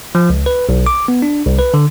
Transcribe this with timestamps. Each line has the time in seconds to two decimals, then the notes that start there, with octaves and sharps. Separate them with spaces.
0.15 F3
0.30 C#2
0.46 B4
0.69 B1
0.86 D6
1.08 B3
1.22 D4
1.46 C2
1.59 B4
1.74 D3